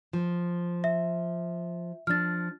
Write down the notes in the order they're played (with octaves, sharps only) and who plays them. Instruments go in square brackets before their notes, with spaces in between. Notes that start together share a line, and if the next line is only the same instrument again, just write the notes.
[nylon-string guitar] F3
[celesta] E5
[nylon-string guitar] F3 D4 [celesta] F6 A6